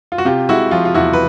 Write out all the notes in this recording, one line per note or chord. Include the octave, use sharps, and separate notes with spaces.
F4
F#4
C3 F4 G4
G#3 E4 F#4
F3 F4
F4
E2 E4 F#4
B4